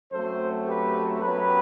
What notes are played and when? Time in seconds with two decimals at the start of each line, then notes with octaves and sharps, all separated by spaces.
0.12 F#2 F#3 A3 C4 A4 C5
0.67 G4 B4
1.21 F#2 F#3 B3 G4 B4